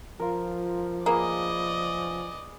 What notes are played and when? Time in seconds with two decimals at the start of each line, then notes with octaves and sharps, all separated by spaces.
0.20 F3 F4 A#4
1.06 A#3 G#4 B4 D5 D#5 F#5